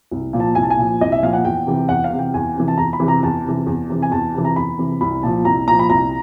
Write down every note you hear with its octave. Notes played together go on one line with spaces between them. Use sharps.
C2
A#2 F3
A5
C2 G#5
A5
G#5
A#2 F3
C2 D#5
E5
A#2 F3 F5
F#5
E2 G5
C3 E3
E2 F#5
F5
C3 E3
G5
E2 G#5
C3 E3
A5
E2 A#5
B5
C3 E3
A#5
E2 A5
C3 E3
E2
C3 E3
G#5
E2 A5
C3 E3
A#5
E2 B5
C3 E3
C2 B5
A#2 F3 A5
C2 A#5
A#2 F3 A#5
B5
C2 A#5